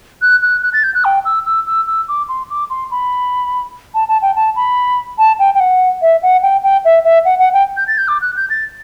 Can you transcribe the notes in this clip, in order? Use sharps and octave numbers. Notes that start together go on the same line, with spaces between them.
F#6
F#6
F#6
A6
G6
F#6
G5
E6
E6
E6
E6
D6
C6
D6
C6
B5
A5
A5
G5
A5
B5
A5
G5
G5
F#5
E5
F#5
G5
G5
E5
E5
F#5
F#5
G5
G6
A6
G6
D6
F#6
G6
A6